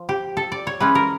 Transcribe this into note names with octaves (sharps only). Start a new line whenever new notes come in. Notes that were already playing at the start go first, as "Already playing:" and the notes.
Already playing: F3
G4
A4
D5
C#5
E3 G#3 C#4 B4
A#4